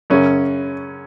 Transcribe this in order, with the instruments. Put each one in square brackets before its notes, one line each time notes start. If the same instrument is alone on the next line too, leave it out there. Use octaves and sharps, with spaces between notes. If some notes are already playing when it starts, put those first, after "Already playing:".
[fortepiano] F#2 C#3 C#4